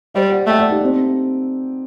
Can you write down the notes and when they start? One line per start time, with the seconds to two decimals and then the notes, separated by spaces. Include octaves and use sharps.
0.14 G3 C5 D#5
0.31 D5 F#5
0.47 A3 D#5 G5
0.58 D5 F#5
0.70 D#4 G4
0.84 C4